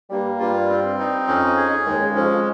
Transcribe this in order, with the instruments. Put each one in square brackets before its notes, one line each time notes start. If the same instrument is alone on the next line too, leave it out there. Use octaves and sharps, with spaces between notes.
[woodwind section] G2 G3 [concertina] A#3
[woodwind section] G2 G3 [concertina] F4
[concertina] C4
D#4
[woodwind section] F2 F3 [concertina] C#4
[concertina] G#4
[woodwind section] D#2 D#3 [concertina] G#3
[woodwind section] C#3
[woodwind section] F2 F3 [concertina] C#4
[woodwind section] F3